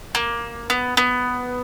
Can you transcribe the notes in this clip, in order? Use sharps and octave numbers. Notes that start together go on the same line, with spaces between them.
A#3
B3
B3